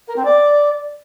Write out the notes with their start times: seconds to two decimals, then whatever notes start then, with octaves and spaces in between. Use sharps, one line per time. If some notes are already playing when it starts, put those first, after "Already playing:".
0.08 A#4
0.16 C4
0.25 D5